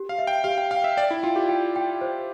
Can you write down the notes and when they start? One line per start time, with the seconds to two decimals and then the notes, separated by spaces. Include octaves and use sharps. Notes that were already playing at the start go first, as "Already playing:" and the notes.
Already playing: G4
0.09 F5
0.18 E5
0.27 G5
0.44 G4 F5
0.58 G5
0.71 F5 G5
0.84 E5
0.97 D5 G5
1.11 E4
1.23 F4 G5
1.36 G4
1.49 G5
1.76 G5
2.01 C5